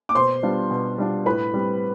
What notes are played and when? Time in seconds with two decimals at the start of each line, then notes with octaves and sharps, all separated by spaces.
0.09 D6
0.15 B2 C5 C6
0.43 G3 B3 D4 F4
0.71 B2
0.98 G3 B3 D4 F4
1.26 A2 B4 B5
1.54 G3 C4